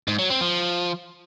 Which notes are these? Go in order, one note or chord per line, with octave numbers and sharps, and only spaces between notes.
G#2
F#3
C4
F3